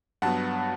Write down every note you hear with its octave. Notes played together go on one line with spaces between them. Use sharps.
G2 F#3 B3 F#5 A5